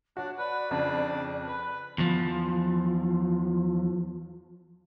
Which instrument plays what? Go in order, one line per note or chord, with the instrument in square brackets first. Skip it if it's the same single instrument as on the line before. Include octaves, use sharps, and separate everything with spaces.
[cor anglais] D4 [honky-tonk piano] F#4 [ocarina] C#5
[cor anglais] B4 [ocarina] D5
[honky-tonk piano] F2 C#3 [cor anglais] D4
[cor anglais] B4
[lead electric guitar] E2 F3